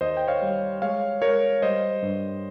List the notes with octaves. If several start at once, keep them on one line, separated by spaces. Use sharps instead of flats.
D#2 C5 D#5
G5
C#5 F5
G3
G#3 C#5 F5
G#3 A#4 C#5
G3 C5 D#5
G2